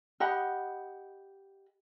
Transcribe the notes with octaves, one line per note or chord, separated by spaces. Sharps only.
G4 D#5 F#5 B5